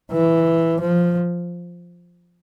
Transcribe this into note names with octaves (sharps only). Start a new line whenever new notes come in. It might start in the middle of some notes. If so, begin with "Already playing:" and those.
E3
F3